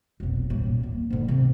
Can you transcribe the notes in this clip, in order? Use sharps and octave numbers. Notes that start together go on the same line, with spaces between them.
F1 B1
D#1 A2
A#3
G#2 D3
C3 C4